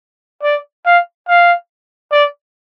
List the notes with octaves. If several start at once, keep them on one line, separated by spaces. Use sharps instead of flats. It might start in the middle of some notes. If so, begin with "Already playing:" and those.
D5
F5
F5
D5